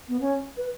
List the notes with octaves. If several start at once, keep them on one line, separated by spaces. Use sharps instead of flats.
B3
C#4
B4